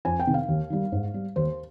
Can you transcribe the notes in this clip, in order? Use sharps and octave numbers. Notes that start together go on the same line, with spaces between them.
F2 G#5
G5
C3 D#3
F5
D#2
D#3 G3
G#2
G3
D#2 C5